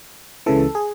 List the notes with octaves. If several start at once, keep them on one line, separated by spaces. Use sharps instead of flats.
C#2 C#3 E3 A4
G#4